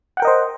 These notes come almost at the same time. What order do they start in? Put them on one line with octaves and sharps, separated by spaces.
F#5 G5 A#4 D#5 C5